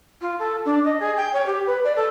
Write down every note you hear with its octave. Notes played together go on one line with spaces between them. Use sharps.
F4
A4
D4
D#5
G#4
G5
C#5
G4
B4
D5
A4